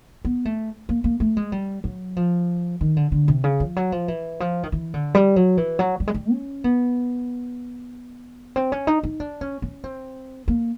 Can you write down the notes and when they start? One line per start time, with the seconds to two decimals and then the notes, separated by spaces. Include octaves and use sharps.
0.25 B3
0.45 A3
0.89 A#3
1.04 A#3
1.20 A3
1.37 G#3
1.52 G3
1.84 F#3
2.17 F3
2.81 D#3
2.97 D3
3.12 D3
3.28 C3
3.44 C#3
3.60 F3
3.76 F#3
3.92 F3
4.08 E3
4.40 F3
4.63 D#3
4.72 E3
4.94 D3
5.15 G3
5.36 F#3
5.57 E3
5.79 F#3
6.00 G3
6.08 G#3
6.14 G3
6.32 C#4
6.64 B3
8.56 C4
8.72 C#4
8.87 D#4
9.03 D#4
9.20 D4
9.41 C#4
9.62 C#4
9.84 C4
10.48 A#3